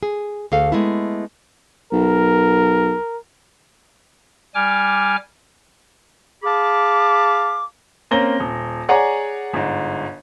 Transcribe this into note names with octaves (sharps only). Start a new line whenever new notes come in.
G#4
D2 G#4 A4 F5
G#3 A3 B3 E4
B1 A#4
G3 G#5 D6 F6
G#4 F5 A5 B5 D6
A#3 C4 C#4 A#5 A#6 G7
D#1
G#4 C#5 D5 F#5 G#5 A#5
G1 G#2